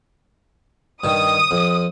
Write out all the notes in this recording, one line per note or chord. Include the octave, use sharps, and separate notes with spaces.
G2 D#3 D#6
F2